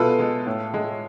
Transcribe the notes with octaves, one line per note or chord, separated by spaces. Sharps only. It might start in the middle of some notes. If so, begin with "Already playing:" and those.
Already playing: B2 G#3 F4 A4 B4 E5
G#3
A2
G#3